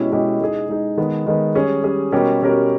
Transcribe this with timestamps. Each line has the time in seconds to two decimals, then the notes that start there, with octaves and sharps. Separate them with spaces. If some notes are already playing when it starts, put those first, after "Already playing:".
Already playing: B2 G#3 C#4 E4 G4
0.12 B2 G#3 C#4 E4 G4
0.40 G#3 D#4 G#4
0.69 G#3 D#4 G#4
0.97 D#3 G#3 B3
1.26 D#3 G#3 B3
1.55 G3 C#4 G#4
1.84 G3 C#4 G#4
2.12 B2 G3 C#4 G4 A#4
2.41 B2 G3 C#4 G4 A#4